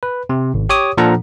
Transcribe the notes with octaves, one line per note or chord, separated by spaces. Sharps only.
B4
C3
G#1
G4 C#5 D6 D#6
A#2 F3 D4 A4 F#5 A#5